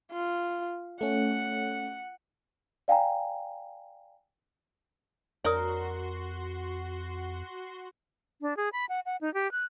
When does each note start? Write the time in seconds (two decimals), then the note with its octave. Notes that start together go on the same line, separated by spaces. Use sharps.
0.12 F4
1.01 A3 C#4 F#5
2.88 D5 F5 G5 G#5 A#5
5.44 F2 F#4 A#4 C#5 D5 C6 D#6
8.41 D4
8.57 G#4
8.73 B5
8.89 F#5
9.06 F#5
9.21 D#4
9.34 G4
9.52 F#6